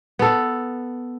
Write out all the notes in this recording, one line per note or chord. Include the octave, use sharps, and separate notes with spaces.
B3 A4